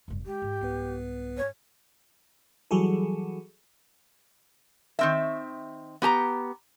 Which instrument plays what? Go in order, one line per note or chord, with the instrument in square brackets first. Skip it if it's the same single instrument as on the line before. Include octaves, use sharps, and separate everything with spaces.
[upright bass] F1 G2
[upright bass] G#3 [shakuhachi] G4
[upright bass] G#2
[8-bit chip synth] C2 B3 B4
[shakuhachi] C#5
[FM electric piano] E3 F#3 G3 F#4 G#4 A4
[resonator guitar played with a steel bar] D#3 C4 E5
B3 G4 A5 A#5